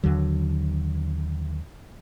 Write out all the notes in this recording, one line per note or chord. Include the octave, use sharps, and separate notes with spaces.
D#2 D3 F#3